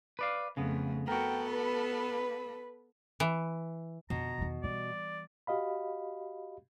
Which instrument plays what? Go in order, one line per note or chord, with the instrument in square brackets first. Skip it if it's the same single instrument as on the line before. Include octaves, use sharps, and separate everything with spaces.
[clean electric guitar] B4 D5 F5
[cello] F2 A3 [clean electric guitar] C#3 B3
[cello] B3 A4 [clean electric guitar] F#4 A#4 [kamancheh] G5
[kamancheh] B4 B5
[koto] E3
[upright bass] F2 D3 [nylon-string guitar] B2 [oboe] A#5
[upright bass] E2 D#3
[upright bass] E3 G3 [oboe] D5
[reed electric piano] F#4 G4 D#5 F5 B5